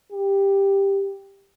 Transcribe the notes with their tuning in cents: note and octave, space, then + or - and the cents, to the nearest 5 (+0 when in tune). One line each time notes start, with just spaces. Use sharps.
G4 +10